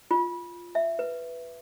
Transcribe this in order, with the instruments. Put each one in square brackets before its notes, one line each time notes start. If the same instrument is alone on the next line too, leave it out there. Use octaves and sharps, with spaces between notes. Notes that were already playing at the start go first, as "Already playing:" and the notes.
[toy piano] F4
E5
B4